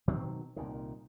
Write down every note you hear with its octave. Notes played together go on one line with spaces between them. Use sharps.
B2 D#3 F#3 C4
C2 A#2 D#3